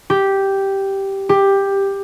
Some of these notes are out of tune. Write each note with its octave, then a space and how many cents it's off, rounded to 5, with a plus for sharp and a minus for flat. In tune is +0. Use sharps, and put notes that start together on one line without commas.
G4 -5
G4 +10